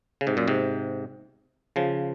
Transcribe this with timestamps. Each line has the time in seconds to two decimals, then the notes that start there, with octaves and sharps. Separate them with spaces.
0.21 C#3
0.27 G#2 C3
0.37 F#2 A#2
0.48 G#2 C3
1.76 C#3 F3